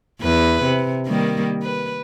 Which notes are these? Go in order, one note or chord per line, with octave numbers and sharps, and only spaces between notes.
E2 B4
C3
D#3 G3 A#3
B4